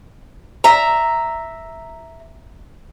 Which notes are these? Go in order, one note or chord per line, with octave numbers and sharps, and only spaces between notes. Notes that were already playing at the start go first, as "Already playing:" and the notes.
E5 A#5